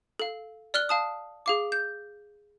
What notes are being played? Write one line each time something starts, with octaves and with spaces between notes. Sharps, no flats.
A4 F5
D5 F6 F#6 G7
F5 A5 D#6
G#4 F5 D6
G6